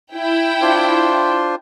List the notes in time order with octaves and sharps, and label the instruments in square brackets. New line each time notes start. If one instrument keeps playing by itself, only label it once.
[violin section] E4 G5
[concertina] D4 F4 C5